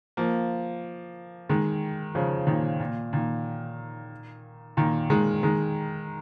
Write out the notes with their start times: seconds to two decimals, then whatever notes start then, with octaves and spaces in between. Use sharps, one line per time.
0.17 F3 A#3
1.49 D#3 G#3
2.15 C#3 F3
2.47 A#2 D#3
2.80 A#2
3.13 A#2 D#3
4.77 A#2 D#3
5.10 D#3 G#3
5.43 D#3 G#3